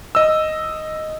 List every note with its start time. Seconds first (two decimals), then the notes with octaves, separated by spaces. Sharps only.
0.15 D#5 E6